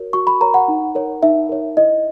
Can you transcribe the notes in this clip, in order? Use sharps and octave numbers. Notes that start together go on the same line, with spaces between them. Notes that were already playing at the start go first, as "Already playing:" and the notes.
Already playing: F#4 A#4 C#5
F#4 C#6
B5
A#4 C#5 A#5
F#5
D#4
A#4 C#5
D#4 E5
A#4 C#5
E4 D#5